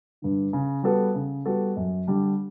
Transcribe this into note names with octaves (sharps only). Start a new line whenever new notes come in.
G2 D3
C#3
G3 B3 F#4 A4
C#3
G3 B3 F#4 A4
F#2
D3 G3 D4